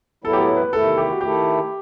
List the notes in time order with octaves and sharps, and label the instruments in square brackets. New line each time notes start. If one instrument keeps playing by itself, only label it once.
[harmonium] A2 F#3 B3 E4 [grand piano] A4
[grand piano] G4
A4
B4
[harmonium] E2 C3 D#3 A3 E4 [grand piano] A4
[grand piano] G4
F#4
[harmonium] D#3 A3 E4 A4 [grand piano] G4